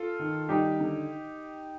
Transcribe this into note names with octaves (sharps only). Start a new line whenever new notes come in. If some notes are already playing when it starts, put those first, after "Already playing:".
Already playing: F4 A4
D#3
G3 D#4 G4
D3